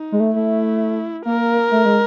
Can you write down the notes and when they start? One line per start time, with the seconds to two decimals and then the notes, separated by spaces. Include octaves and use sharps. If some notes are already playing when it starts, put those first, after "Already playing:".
Already playing: D#4
0.12 G#3
0.20 A3
0.35 A3 E4
1.25 A#3 A#4
1.71 A3
1.85 G#3